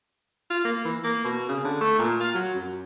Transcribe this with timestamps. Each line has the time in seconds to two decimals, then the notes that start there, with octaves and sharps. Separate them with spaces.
0.50 F4
0.65 A#3
0.85 E3
1.04 A#3
1.24 B2
1.49 C#3
1.65 D3
1.81 A3
1.99 A#2
2.20 F4
2.35 F#3
2.54 F#2